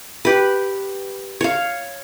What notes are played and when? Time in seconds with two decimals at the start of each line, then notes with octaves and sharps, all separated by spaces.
0.25 G4 B4
1.41 C#5 F5